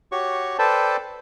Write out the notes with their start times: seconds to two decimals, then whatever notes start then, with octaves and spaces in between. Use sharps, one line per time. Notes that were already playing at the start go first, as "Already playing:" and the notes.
0.12 F#4 G4 C#5 C#6
0.59 A4 B4 C5 D5 G5 A5